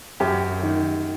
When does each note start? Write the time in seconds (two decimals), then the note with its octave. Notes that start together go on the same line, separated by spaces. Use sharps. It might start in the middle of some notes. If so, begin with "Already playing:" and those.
0.20 F#2 G4
0.63 D#3